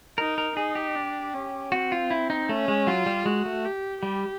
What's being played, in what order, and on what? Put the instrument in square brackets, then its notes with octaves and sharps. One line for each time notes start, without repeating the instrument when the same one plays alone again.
[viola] D#4 [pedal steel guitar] A#4
[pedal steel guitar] A#4
[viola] D#4 [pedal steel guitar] G#4
[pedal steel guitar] G4
[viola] D4
C#4
[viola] C4 [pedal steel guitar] F#4
[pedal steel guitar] F4
E4
D#4
[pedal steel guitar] A3 [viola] C#4
[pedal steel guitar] G#3
[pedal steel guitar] F#3 [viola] F4
[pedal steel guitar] G3
[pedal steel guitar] G#3 [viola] F#4
[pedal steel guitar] A3
[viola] G4
[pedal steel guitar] G3 [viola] G4